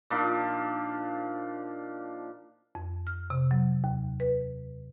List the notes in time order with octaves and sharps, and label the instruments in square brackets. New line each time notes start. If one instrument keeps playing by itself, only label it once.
[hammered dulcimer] A#2 F3 D4 D#4
[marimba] F2
F6
C3
F#3
D#2
B4